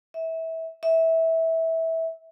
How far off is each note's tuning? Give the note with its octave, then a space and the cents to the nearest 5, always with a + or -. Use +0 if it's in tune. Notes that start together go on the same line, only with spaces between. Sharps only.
E5 -25
E5 -20